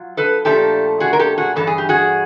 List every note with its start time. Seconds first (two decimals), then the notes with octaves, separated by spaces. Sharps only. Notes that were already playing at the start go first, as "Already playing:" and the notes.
Already playing: F#3 F4
0.17 A4 B4
0.45 A#2 F3 A3 D4 G4 A4
1.00 F#4 G#4
1.13 A#4
1.19 G4 A4
1.38 F#4 G#4
1.56 G2 E3 A4
1.67 G#4
1.78 G4
1.89 F#4 G#4